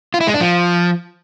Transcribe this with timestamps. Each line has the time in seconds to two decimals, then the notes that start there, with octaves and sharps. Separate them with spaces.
0.14 F4
0.21 E4
0.27 G#3
0.34 D4
0.41 F3